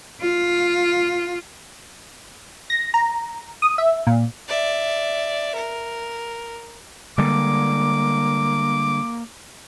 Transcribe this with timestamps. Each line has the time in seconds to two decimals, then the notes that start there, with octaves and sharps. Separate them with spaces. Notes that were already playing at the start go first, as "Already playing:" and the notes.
0.21 F4
2.70 A#6
2.94 A#5
3.62 D#6
3.78 E5
4.07 A#2
4.48 D5 E5
5.55 A#4
7.18 D3 G3 G#3 A#3 D6